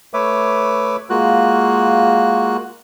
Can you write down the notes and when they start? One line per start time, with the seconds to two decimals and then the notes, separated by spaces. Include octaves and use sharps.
0.14 A3 B4 C#5 E5 D6
1.10 G#3 A#3 F4 F#4 F#6